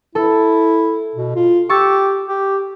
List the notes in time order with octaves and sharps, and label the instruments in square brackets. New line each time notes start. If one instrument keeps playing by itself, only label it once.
[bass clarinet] E4 [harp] A4
[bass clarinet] B2
F4
[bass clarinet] G4 [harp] C#6 E6 A6
[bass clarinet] G4